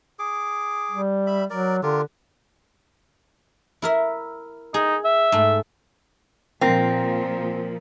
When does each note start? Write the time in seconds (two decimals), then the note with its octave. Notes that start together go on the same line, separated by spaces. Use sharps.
0.19 G#4 D6
0.91 G3
1.27 E5 B5
1.50 F#3 A#4 D5
1.83 D3 F4 G4 A#4
3.82 E4 A#4 E5
4.74 D#4 G#4
5.05 E5
5.32 G#2 A3
6.61 A#2 F3 C4 F4 A#4